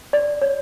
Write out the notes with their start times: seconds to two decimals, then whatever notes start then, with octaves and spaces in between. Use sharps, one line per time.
0.13 D5
0.42 C#5